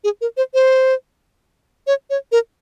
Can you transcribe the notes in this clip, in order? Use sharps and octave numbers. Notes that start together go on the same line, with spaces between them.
G#4
A#4
C5
C5
C#5
C#5
A#4